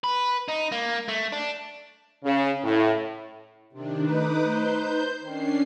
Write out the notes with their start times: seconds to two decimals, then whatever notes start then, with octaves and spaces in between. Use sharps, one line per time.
0.04 B4
0.48 D#4
0.72 A#3
1.08 A3
1.32 D4
2.24 C#3
2.64 A2
3.73 C3 D#3 D4
4.06 A3 D#4 B4 D6 D#6
4.42 C5 G6
5.23 D#3 C#4 D4 C7